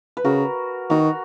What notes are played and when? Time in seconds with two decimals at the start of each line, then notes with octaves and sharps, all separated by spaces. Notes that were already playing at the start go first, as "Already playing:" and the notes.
0.17 B4
0.25 C#3 F#4 A#4
0.90 D#3 F#4 A#4